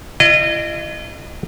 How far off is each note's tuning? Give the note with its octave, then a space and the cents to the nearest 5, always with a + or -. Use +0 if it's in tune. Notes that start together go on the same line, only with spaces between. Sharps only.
E4 +40 D#5 -25